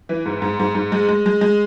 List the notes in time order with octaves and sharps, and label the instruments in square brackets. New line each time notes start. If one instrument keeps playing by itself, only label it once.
[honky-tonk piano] E3
G#2
G#2
G#2
G#2
G#3
G#3
G#3
G#3